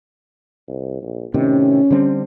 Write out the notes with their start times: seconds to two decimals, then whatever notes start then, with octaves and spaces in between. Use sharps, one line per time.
0.68 C2
1.02 A#1
1.34 A2 C3 D#3 C#4
1.91 D3 G3 C4